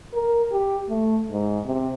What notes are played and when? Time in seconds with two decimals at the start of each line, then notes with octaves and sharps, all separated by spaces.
0.13 A#4
0.51 G4
0.89 A3
1.30 G#2
1.65 C3